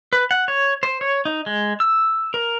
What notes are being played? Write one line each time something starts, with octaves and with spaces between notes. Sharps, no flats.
B4
F#5
C#5
C5
C#5
D#4
G#3
E6
A#4